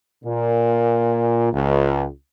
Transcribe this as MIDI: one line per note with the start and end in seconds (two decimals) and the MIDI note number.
0.24 1.49 46
1.53 2.06 37